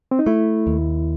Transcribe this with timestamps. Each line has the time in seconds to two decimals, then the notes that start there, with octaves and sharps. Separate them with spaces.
0.11 C4
0.19 D#4
0.26 A3 E4
0.67 D#2